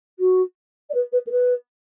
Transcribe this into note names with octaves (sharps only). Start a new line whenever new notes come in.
F#4
D5
B4
B4
A#4
B4